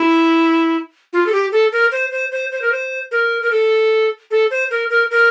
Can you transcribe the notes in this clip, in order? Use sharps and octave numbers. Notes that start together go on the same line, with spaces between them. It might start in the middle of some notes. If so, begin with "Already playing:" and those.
Already playing: E4
F4
A4
G4
A4
A#4
C5
C5
C5
C5
A#4
C5
A#4
A#4
A4
A4
C5
A#4
A#4
A#4